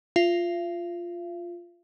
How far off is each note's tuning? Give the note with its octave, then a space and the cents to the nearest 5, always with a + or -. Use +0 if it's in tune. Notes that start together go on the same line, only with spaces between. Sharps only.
F4 +0 F5 -45